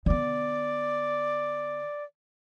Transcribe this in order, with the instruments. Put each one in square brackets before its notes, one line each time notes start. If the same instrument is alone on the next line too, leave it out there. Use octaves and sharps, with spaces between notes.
[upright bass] D3 B3 [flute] D5